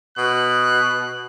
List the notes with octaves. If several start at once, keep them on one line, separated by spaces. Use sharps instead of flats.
B2 F#6